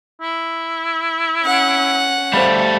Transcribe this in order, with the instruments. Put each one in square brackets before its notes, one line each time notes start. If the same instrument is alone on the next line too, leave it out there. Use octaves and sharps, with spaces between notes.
[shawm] E4
[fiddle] C#4 F#5
[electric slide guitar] G3 A3 [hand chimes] C5 F5 B5